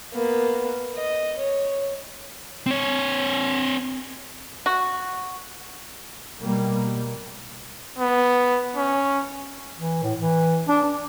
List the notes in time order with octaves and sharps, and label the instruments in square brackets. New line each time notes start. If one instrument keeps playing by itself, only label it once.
[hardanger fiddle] A#3 B3
D#5
C#5
[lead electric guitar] C4 C#5
[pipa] F#4
[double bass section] B2 G3 A#3
[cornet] B3
C#4
[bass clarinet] E3
A2
E3
D4
D4